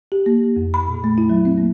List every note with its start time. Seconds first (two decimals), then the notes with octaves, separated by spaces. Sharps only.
0.12 G4
0.26 A#3
0.56 F2
0.74 B5
0.88 A#2
1.04 A3
1.18 E4
1.30 F#3
1.45 C4
1.58 A#3